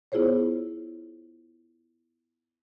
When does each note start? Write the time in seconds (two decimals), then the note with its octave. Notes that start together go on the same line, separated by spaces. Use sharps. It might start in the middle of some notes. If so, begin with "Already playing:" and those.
0.12 B3 E4 F4 G#4 C5 C#5